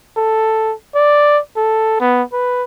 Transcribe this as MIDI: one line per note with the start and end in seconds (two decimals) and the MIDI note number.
0.17 0.74 69
0.95 1.40 74
1.57 1.99 69
2.00 2.23 59
2.33 2.64 71